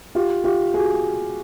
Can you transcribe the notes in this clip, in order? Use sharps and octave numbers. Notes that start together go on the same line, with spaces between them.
F4 G4
F4 G4
F#4 G#4